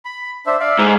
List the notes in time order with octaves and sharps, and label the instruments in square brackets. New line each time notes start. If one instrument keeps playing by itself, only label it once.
[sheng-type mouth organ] B5
D4 C5 E5
D5 E5 F5
[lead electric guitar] G#2